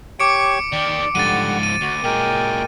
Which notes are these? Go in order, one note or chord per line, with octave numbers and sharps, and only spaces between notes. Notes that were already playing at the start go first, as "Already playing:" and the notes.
G4 C#5 C#6 D6 C#7 D7
D#3 G4 D5
G#2 D3 F3 G3 F#5 A6 D#7
D#7
D2 F#4
A#2 F#3 G#3 A#4 G5